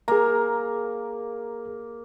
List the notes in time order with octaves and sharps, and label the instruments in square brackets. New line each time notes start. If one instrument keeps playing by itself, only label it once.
[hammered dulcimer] A#3 [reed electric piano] G#4 A#5